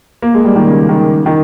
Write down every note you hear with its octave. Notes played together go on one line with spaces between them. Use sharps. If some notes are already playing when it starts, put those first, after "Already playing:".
A#3
G#3
G3
D#3
C#3
D#3
D#3